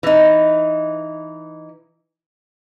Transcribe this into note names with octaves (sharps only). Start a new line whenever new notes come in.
E3 D#4